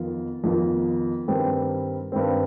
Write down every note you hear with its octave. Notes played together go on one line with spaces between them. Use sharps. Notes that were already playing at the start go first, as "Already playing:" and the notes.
Already playing: F2 D#3 B3 F4
F2 D#3 B3 F4
G2 D#3 G3 C4
G2 D#3 G3 C4